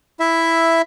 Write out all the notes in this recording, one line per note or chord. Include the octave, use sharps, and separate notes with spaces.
E4 E5